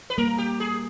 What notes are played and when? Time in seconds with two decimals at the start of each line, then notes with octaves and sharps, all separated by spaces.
0.10 B4
0.18 G3 A#3 A#4
0.38 G4
0.60 G#4